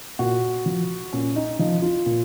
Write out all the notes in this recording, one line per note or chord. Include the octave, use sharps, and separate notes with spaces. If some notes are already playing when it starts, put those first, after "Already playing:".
A#2 F#4
F3
A#2 C#4
D#4
F3 D#4
F4
A#2